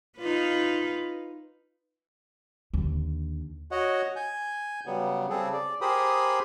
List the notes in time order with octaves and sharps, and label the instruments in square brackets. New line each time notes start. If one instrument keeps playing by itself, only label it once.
[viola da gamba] D#4 F4 B4
[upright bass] D#2 D3
[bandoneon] F#4 C#5 D#5 F#5
G#5 G6
C#3 F#3 G3 B3
C#3 G3 C4 G#4 A4
D5
G4 G#4 A#4 C5 B5 D#6